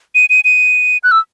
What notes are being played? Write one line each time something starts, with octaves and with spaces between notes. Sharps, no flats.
D#7
D#7
D#7
F#6
E6